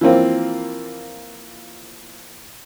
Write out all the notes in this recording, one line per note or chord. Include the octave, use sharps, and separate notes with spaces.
E3 F3 A#3 C4 F4